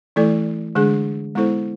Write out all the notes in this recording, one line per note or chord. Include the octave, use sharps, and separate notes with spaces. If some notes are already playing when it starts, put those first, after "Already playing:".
E3 A3 E4 A4 D5
D3 G#3 D4 G#4
G#3 B3 E4 A4 C5